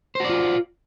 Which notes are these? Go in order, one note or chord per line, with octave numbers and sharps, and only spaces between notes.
F4 F#4 C5 D5